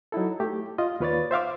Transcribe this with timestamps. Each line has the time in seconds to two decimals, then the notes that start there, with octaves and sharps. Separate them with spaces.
0.12 F#3 D#4 E4 A4
0.40 A3 G4
0.78 F4 D#5
1.00 D#2 F4 B4 C#5 D5 A6
1.31 C5 E5 F5 D6